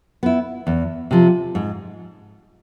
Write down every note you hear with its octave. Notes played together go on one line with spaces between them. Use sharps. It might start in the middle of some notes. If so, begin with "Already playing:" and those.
B3 E4
E2
C3 F3
G#2